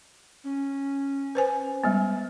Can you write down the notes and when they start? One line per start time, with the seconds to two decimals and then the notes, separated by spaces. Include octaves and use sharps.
0.44 C#4
1.35 B4 C5 G#5
1.84 G3 G#3 B3